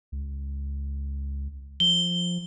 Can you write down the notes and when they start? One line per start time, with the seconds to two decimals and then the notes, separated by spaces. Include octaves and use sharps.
0.12 C#2
1.80 F3 G7